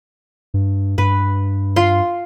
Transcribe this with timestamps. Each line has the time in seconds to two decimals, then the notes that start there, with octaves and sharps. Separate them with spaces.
0.54 G2
0.98 G2 B4
1.76 F4 C6